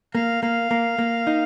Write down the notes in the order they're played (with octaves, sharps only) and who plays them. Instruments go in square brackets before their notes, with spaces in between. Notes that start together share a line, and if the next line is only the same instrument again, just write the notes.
[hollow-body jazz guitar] A#3 [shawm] F5
[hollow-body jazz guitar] A#3 [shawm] F5
[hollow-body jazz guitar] A#3
A#3
D#4